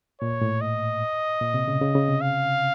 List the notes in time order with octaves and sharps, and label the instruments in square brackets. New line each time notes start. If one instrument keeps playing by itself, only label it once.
[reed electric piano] A#2 [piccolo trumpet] C#5
[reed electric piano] A2
[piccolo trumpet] D#5
[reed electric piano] A#2
C3
C#3
C#3
C#3
C3
[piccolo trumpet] F5